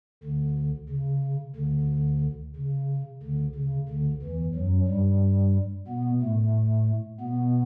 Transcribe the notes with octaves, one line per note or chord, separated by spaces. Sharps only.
D2 D3
C#3
D2 D3
C#3
D2 D3
C#3
D2 D3
E2 E3
F#2 F#3
G2 G3
B2 B3
A2 A3
B2 B3